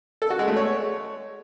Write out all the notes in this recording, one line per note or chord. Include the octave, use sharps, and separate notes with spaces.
A4
F#4
G#3
A3
C#5